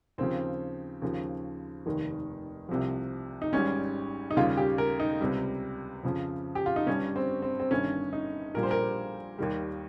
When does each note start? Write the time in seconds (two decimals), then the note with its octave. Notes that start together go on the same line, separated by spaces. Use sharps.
0.18 D#2 C#3 F3 C4
1.02 D#2 C#3 F3
1.86 F1 D#2 D#3
2.69 C2 C3 F3
3.42 D#4
3.53 G#1 G#2 G3 C#4
4.31 D#4
4.37 D#2 C#3 G3 F4
4.57 G4
4.78 A#4
5.00 D#4
5.21 C#2 C3 G3
6.03 F2 C#3 F3
6.55 G4
6.66 F4
6.76 D#4
6.87 G1 G2 G3 C#4
7.16 C4
7.42 C4
7.60 C4
7.71 G1 G2 D#3 C#4
8.13 D#4
8.54 A#1 A#2 G3 A#4
8.63 C5
8.71 A#4
9.38 D#2 D#3 G3